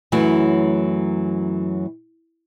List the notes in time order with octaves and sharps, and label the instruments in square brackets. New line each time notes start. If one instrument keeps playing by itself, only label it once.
[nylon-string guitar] F#2 E3 F#3 A3